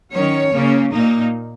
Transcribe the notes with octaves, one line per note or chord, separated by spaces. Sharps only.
D#3 F#3 C#4 C#5
C#3 A#3 C#4
A#2 A#3 D#4